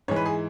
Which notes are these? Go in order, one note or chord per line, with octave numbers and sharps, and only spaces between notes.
G#2 E3 B4 C#5
G#4